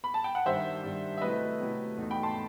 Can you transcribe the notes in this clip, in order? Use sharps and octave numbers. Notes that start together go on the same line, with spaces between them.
B5
A5
G5
F#5
G2 D#3 G3 C5 E5
G2 D#3 G3
E5
C3 F#3 A3 E4 B4 D#5
C3 F#3 A3 E4
E2 B2 F#3 A3 D#4
G5 B5
A5 C6